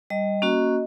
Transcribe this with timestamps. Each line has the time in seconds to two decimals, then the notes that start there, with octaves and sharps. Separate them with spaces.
0.10 G3 D#5
0.42 A#3 C#4 F#4